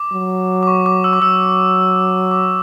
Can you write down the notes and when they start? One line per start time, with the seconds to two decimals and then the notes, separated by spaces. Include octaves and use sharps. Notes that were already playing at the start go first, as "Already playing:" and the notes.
Already playing: D6
0.14 F#3
0.63 D6
0.67 C#6
0.86 D6
1.04 E6
1.13 D6
1.22 F#3 E6
2.31 D6